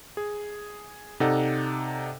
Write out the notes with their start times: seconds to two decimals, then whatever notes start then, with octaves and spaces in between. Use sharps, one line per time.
0.17 G#4
1.20 C3 D#4 A4 D5 F#5